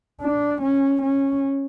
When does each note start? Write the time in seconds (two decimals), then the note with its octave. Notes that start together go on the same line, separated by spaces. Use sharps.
0.21 D4
0.62 C#4
1.02 C#4